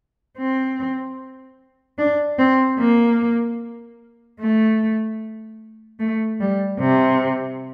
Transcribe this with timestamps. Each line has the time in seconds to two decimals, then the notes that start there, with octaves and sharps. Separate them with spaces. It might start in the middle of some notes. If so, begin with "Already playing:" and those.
0.38 C4
1.99 D4
2.38 C4
2.79 A#3
4.40 A3
6.00 A3
6.40 G3
6.80 C3